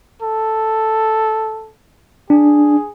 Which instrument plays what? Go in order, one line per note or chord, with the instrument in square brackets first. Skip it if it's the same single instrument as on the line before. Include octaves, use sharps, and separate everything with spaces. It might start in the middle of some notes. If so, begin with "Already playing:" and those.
[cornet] A4
[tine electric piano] D4 [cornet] G#4